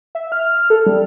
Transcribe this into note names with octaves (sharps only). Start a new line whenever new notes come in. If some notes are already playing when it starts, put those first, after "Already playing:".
E5
F6
A4
G3